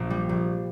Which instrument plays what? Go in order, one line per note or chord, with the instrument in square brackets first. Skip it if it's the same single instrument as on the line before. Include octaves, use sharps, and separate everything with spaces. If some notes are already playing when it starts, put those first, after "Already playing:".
Already playing: [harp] A#1 A#2
G3
A#1